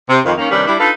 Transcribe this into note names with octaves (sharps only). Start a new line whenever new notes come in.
C3
F2 D#3 F3
D#3 A#3 C#4
C3 D#3 G3 C#4 D4 B4
G3 D4 E4
D4 D#4 F4 A4 B4